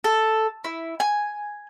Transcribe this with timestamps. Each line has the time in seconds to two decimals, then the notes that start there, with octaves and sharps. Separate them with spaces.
0.04 A4
0.64 E4
1.00 G#5